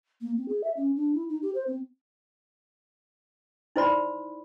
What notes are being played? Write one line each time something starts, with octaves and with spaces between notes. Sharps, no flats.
A#3
C4
G#4
E5
C#4
D4
E4
D#4
G4
C5
C4
D#4 E4 C5 D5 B5 C6